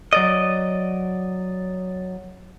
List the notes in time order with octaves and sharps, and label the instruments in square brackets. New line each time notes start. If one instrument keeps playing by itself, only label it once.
[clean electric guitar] F#3 D5 D#5